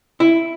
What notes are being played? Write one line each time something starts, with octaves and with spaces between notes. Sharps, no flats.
E4